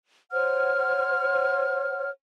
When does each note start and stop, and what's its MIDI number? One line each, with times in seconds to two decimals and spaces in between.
0.32 2.09 72
0.32 2.09 73
0.32 2.09 78
0.32 2.09 89